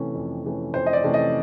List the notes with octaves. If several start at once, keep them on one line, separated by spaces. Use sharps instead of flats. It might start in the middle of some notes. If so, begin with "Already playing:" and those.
Already playing: C3 E3 A3 C#4
F2
C3 E3 A3 C#4
F2 C5
D#5
D5
C3 E3 A3 C#4
D#5